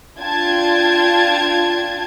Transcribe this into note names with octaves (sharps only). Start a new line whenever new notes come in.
D4 F4 G5 A5 G#6